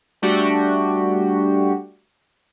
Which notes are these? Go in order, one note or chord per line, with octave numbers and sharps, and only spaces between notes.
G3 A3 D4 F#4 G4